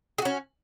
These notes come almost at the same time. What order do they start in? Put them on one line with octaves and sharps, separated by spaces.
G#4 F#4 C#4